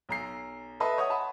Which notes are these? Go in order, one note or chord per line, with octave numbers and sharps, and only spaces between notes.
B1 A#5 C7
A4 B4 D#5 E5 A5 C6
C#5 F#5 D#6
F#5 A5 B5